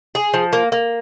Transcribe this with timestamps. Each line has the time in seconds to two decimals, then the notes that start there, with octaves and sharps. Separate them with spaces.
0.15 G#4
0.34 F3
0.53 A#3
0.72 A#3